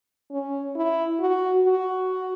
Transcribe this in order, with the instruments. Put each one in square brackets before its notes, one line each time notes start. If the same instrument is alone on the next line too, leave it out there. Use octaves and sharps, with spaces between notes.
[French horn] C#4
E4
F#4
F#4